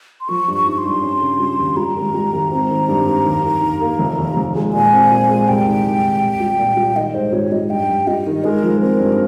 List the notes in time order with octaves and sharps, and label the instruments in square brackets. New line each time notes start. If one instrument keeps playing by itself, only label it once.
[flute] C6
[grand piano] F3 [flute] C#6
[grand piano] G2
[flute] C#6
[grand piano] D#4
[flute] C#6
C6
[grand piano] G2
C#4
C#3
G3
D#2
[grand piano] G3 [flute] A#5
[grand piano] G#1
G3
G#1
C4
D#3
G2
D#3
D#2
D#3
D#2
A#3
F1
D#2
F1
G#3
[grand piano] A#2 [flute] G#5
[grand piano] C4
A#2
G#3
[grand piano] C2 [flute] G5
[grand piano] D#3
C2
D#3
C2
G3
A#2
G3
[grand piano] D#3 [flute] D#5
[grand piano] G#2 [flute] C5
[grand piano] G3 [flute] C#5
[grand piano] G3 [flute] D#5
[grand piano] G2 [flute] G5
[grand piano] G2
[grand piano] G3 [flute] D#5
[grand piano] D#3
[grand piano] G#3 [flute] A#4
[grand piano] F3
[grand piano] C4 [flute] A#4
[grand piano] G2